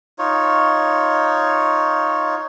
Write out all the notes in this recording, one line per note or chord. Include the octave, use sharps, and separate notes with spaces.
D#4 F4 C#5